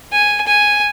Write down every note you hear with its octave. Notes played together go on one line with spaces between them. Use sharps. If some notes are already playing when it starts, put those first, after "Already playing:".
G#5
G#5